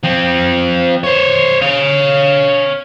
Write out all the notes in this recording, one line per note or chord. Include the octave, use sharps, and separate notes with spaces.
F3 C4
C5 C#5
C#5 F5